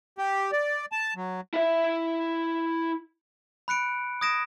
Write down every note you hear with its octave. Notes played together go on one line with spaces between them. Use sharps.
G4
D5
A5
F#3
E4 E5
B5 F#6 C#7 D7
D#6 G#6 A#6 D7 E7